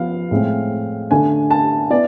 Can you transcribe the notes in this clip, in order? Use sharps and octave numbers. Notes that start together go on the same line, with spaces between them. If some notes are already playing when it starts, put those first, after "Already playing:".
Already playing: F3 B3 F5
A2 G#3 C4
D3 A3 D4 G#5
A5
B3 E4 D5